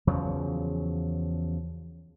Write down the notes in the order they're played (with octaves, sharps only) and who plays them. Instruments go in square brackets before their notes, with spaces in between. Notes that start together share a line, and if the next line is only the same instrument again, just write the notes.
[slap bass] E2 C#3 F3 F#3